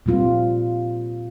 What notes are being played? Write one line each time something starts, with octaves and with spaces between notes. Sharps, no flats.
A#2 G3 C4 F4